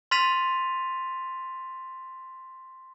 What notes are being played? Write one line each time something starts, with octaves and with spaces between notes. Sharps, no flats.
C6 F6 A6 B6 D#7 F7